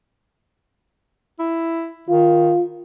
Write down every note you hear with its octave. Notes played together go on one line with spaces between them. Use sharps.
E4
D#3 F4